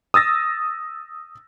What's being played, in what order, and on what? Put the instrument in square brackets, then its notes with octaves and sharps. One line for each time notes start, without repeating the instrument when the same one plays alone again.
[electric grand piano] D#6 E6 A6 A#6